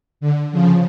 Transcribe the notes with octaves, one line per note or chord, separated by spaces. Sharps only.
D3
C#3 F3